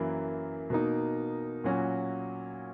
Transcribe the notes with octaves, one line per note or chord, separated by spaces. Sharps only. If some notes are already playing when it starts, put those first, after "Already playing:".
Already playing: F#2 E3 A#3 E4
B2 A#3 D#4
A#2 F#3 C#4 F#4